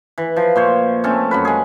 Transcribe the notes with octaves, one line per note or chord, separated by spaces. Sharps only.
E3
F3
A#2 C5 C#5
A3 C4 C#4 A4
F#2 F#3 B4
G#3 G#4